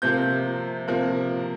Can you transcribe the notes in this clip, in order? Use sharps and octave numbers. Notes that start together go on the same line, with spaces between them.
C3 F3 A#3 G6
C3 F3 A#3